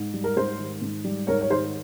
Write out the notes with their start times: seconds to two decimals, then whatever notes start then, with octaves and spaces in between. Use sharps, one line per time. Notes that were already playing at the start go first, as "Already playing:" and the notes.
Already playing: G#2
0.14 G3
0.24 A#4
0.37 G#2 C5
0.59 D#3
0.82 G#2
1.04 G3
1.27 G#2 A#4 C#5
1.41 C#5
1.50 D#3 C5